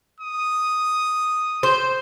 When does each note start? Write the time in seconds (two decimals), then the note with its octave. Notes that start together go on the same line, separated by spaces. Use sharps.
0.20 D#6
1.63 C5